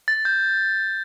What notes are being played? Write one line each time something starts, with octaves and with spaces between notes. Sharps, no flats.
A6
G6